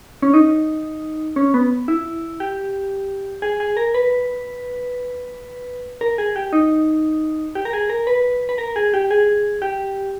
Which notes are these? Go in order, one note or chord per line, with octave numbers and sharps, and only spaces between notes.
C#4
D#4
C#4
B3
E4
G4
G#4
G#4
A#4
B4
A#4
G#4
G4
D#4
G4
A#4
G#4
A#4
B4
B4
A#4
G#4
G4
G#4
G4